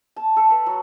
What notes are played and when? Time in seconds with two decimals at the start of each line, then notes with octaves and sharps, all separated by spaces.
0.16 A5
0.36 A4
0.50 B4
0.66 F#3